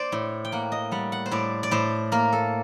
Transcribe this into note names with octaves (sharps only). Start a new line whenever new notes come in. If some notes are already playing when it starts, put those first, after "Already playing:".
Already playing: C5 D5
A2
G5
A#3 F#5
D#5
G3 F#5
F#5
C5
A2 D5
D5
A2 C5
A#3 A#4
A4